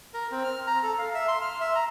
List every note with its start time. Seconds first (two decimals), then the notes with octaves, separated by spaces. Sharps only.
0.14 A#4
0.31 C4
0.44 F6
0.67 A#5
0.83 A4
0.98 F5
1.14 E5
1.28 C6
1.41 F6
1.60 E5
1.75 A#5